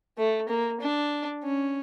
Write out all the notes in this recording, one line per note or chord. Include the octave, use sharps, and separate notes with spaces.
A3
A#3
D4
C#4